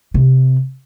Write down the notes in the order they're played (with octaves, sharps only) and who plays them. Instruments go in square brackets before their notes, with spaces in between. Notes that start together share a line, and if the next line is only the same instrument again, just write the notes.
[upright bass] C3